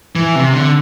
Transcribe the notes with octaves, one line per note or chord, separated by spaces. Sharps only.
E3
C3
D3